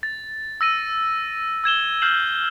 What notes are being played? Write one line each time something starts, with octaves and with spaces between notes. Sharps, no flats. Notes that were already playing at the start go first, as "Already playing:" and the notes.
A6
E6 A#6 D#7
E6 G#6 E7 G7
F6 G6 C7 E7 F#7